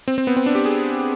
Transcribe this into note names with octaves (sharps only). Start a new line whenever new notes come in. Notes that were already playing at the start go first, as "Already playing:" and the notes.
C4
C4
B3
C4
D4
G4
G#4